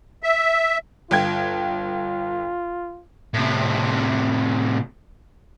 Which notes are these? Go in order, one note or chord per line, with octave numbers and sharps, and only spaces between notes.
E5
G1 F4 G5 G#6
A2 C3